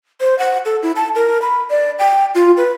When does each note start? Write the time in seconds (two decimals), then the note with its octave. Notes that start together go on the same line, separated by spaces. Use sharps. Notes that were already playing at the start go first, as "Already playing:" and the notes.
0.21 C5
0.39 F#5
0.65 A4
0.83 E4
0.96 A5
1.15 A#4
1.42 B5
1.70 D5
1.99 G5
2.35 F4
2.57 B4